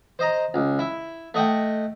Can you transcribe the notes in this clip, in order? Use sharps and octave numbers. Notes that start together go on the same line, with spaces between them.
C5 D#5 A#5
C#2
E4
A3 D#5 F#5 G5